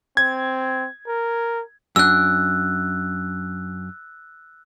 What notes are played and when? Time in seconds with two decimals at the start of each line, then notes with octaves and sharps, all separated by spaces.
0.17 C4 G#6
1.07 A#4
1.96 F#2 D4 E6 F#6